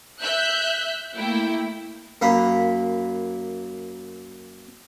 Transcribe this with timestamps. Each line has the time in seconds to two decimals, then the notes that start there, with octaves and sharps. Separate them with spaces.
0.21 E5 E6 F#6 G6
1.16 A3 A#3 E4 G5
2.21 F#2 A#3 F5 B5